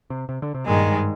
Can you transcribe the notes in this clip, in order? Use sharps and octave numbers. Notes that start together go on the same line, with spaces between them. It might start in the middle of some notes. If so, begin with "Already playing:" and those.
C3
C3
D3
C3
G2 A#2 D#3 G#3
G#2